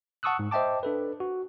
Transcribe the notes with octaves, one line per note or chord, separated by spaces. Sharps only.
F#5 A5 C#6 D#6 E6 F#6
G#2
C5 D#5 E5 G5 A5 D6
D4 A4 B4
F#4